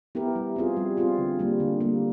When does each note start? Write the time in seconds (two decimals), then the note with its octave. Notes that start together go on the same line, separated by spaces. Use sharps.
0.15 B3 E4 G4 A#4
0.35 G3
0.56 C4 F4 G#4
0.77 G3
0.97 C4 F4 G#4
1.18 D3
1.39 G3 A#3
1.60 D3
1.81 G3 A#3